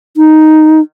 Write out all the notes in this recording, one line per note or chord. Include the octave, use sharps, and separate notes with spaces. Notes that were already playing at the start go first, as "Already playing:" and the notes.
D#4